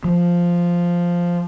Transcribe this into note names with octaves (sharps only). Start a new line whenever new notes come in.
F3